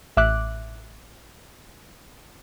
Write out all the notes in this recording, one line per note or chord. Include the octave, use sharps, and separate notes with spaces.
A1 E5 D6 F#6